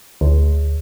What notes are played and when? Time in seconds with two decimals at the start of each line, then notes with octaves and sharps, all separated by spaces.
0.21 D2